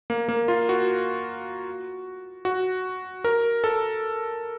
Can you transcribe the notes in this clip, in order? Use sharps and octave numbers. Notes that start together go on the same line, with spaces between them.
A#3
A#3
F4
F#4
F#4
A#4
A4